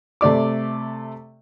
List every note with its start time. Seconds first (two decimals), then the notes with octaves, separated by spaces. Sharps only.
0.21 C3 A3 D5 D6